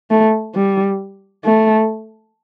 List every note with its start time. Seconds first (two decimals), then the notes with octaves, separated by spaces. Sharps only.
0.11 A3
0.55 G3
1.45 A3